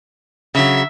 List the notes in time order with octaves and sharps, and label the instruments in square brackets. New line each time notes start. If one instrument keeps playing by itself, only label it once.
[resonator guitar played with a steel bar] C#3 F#3 [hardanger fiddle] E5